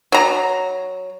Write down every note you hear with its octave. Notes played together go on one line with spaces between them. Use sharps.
F#3 A#5